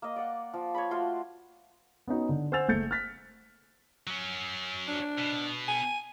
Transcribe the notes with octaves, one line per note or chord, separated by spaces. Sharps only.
A#3 D#5
D5 F#5
F3
C#5 D5 B5
A3 F4 F#4 C5
B3 C#4 D#4 F#4
D3
C5 F#5 G#5 E6 A6 F7
F#1 A3 G6 A6 C#7
F6 F#6 A6 B6
F#3 C#4
D4
B2
G#5